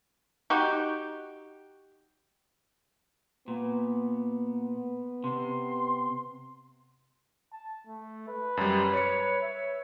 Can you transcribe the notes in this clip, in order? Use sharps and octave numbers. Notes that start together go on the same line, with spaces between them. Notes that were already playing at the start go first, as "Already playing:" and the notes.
D#4 F#4 G4
A#2 B3
C3 C6
A5
A3
B4
F#2 G3
C#5 C#7
E5